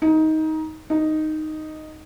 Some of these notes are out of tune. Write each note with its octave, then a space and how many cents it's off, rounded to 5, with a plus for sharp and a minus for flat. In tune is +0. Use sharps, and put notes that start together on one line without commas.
D#4 +15
D#4 -5